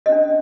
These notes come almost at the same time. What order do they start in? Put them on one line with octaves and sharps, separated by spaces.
D#5 C#4 D4